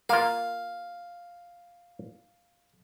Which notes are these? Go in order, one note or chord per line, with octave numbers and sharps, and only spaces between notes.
A#3 F4 F5